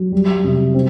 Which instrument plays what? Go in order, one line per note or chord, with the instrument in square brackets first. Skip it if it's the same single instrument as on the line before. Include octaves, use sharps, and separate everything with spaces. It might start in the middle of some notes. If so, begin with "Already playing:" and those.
Already playing: [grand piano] F#3
G3
C3
C4